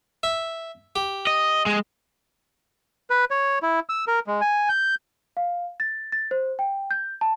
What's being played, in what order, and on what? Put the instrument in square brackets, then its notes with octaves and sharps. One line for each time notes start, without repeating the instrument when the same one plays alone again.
[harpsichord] E5
G4
[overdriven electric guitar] D#5
G#3
[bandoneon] B4
C#5
E4
E6
A#4
G#3
G#5
G6
[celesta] F5
A6
A6
C5
G5
G6
A5